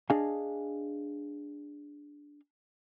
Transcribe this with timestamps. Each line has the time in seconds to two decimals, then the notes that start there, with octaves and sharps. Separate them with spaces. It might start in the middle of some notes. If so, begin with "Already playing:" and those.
0.10 D4 G#4 D#5 F5 G#5